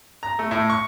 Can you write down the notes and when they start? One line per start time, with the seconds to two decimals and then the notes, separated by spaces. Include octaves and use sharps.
0.23 A#5
0.39 A3
0.51 A2
0.70 C#6